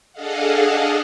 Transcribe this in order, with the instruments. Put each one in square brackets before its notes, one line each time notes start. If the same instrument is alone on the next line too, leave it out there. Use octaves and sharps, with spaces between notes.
[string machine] D4 G#4 A4 D#5 F5 F#5